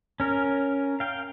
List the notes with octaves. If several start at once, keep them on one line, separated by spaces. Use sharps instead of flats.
C#4 A#4
F5 G5